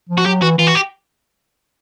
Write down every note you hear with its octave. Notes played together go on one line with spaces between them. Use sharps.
F3
F#4
F#3 G4
E3 F#4
E3 F4
F#4
G4